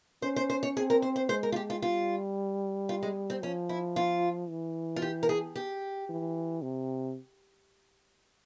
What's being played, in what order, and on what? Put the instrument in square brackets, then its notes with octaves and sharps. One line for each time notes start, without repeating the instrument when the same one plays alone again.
[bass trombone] C#4 [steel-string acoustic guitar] C5
[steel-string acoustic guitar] C5
C5
C#5
[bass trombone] C4 [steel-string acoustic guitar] G#4
[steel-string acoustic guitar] A#4
C5
C5
[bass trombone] G#3 [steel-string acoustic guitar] C5
[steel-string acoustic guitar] A#4
F4
G4
F4
[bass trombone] G3 [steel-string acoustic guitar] F4
[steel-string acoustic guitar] F4
G#3
C4
[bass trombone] F3 [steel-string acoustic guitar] C#4
[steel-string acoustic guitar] E4
F4
[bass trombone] E3
[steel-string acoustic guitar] F4
G4
A#4
G#4
G4
[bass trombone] E3
C3